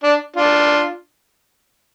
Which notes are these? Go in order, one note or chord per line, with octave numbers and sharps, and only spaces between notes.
D4
D4 F4